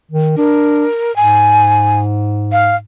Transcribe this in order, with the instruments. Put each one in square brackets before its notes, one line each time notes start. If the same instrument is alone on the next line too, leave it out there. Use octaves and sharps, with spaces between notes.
[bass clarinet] D#3
[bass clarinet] D4 [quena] A#4
[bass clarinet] G#2 [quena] G#5
[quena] F5